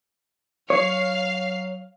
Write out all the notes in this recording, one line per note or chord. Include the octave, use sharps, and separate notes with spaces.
F#3 C#5 F5 F6 C7